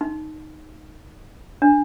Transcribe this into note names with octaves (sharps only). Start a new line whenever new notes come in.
D#4
D4